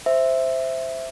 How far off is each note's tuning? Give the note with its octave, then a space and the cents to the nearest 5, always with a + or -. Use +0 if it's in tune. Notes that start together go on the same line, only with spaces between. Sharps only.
C5 +0 E5 +0